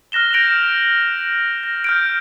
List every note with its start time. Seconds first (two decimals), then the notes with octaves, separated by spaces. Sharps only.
0.12 F6 F#6 A#6 E7 G7
0.33 G6 A#6 D7 F7 F#7
1.64 A#6
1.84 F6 G6 D7